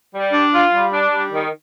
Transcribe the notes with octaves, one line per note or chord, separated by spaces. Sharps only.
G3
D4
F4
G3
D4
G3
D#3